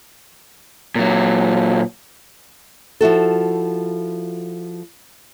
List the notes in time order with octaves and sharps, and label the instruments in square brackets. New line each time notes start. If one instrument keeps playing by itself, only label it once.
[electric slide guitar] A#2 F#3
[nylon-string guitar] F3 E4 F#4 A4